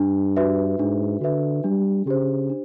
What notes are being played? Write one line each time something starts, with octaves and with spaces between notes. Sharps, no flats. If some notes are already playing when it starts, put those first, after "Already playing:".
Already playing: G2 D4
F#4 B4 E5
G#2 D4
D3 F#4 B4 E5
G3 D4
C#3 G4 C5
D4